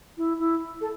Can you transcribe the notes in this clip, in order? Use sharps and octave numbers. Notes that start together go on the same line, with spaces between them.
E4
E4
A4